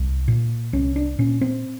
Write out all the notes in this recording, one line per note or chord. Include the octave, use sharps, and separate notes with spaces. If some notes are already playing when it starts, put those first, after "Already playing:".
Already playing: C2
A#2
C2 C#4
D4
A#2 C#4
C4